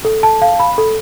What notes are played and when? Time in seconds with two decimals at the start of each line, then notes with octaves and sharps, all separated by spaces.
0.05 A4
0.23 A5
0.42 F5
0.59 B5
0.78 A4